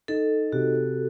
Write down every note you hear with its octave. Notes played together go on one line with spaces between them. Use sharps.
D#4 A4
C3 F#4